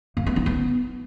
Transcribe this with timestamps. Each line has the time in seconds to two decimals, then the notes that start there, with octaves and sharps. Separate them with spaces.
0.17 A#3
0.26 B3
0.36 D#4
0.46 B3